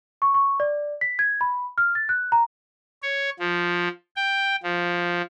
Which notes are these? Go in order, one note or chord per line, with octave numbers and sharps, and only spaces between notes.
C#6
C#6
D5
B6
G#6
B5
F6
A6
F#6
A#5
C#5
F3
G5
F3